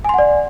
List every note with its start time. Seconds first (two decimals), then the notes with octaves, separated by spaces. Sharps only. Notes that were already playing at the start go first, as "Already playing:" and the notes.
0.05 G#5
0.09 C6
0.14 F#5
0.18 D5